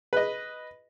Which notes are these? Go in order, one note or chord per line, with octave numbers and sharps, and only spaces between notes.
B4 D#5